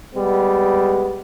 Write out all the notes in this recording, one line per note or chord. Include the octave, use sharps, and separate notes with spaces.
G3 G#3 B3